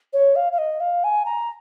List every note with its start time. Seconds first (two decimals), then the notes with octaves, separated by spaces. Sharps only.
0.13 C#5
0.36 F5
0.53 F5
0.58 D#5
0.80 F5
1.04 G#5
1.26 A#5